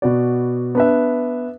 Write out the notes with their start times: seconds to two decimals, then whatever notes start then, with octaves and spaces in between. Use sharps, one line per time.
0.02 B2 B3 F#4 D5
0.75 B3 D4 B4 E5